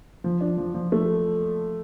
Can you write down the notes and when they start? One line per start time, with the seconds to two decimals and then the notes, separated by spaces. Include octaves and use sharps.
0.24 F3
0.41 D4
0.58 F3
0.74 F3
0.92 A3